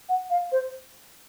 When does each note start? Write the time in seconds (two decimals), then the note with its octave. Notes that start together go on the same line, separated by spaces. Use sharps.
0.09 F#5
0.30 F5
0.51 C5